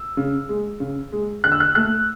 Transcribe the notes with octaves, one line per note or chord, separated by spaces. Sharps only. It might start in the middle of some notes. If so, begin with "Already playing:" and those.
Already playing: E6
C#3
G#3
C#3
G#3
D3 F#6
E6
F#6
A3 F#6